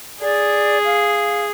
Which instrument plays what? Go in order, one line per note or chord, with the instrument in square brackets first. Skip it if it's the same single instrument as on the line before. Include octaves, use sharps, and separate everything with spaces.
[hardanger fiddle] G#4 [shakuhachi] D5
[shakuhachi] F5